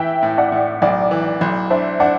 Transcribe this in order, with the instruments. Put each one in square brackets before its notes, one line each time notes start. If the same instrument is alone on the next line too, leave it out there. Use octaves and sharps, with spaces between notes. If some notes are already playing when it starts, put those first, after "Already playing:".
Already playing: [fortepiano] E3 [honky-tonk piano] E5 G5
[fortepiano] A2
[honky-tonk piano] D5 F#5
[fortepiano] A2
[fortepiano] B1 [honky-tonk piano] D5 F#5
[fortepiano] E3
B1
[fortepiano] D4 [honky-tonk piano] C5 E5
[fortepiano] D4 [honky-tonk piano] D5 F#5